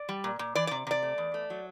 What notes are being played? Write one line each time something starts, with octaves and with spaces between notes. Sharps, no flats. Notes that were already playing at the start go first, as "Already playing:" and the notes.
Already playing: D5
G3
A#2
A#2
E3 D5
D5
C3
C3 D5
A3
E2
A3
F#3